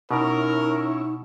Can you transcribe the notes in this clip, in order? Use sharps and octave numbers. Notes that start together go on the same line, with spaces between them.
B2 C#4 D#4 E4 A#4